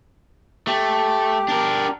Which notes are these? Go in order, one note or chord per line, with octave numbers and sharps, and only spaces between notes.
A3 G4
D4 A#4